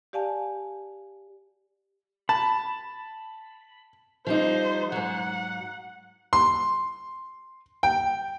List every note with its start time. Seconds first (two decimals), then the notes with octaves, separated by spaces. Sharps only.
0.13 G4 D5 F5 G#5 A5
2.29 A5 B5
4.26 F3 G3 D#4 C5
4.92 G#2 F#3 F#5
6.33 C6
7.83 G5